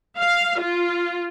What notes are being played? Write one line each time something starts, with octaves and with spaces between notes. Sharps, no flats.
F5
F4